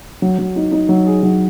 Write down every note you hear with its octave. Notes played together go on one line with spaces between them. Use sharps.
F#3
F#3
D#4
D#4
F#3
G#4
F#3